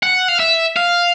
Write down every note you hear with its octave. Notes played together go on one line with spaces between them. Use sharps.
F#5
F5
E5
F5